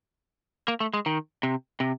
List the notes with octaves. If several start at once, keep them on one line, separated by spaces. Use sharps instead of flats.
A#3
A3
G#3
D#3
C3
C3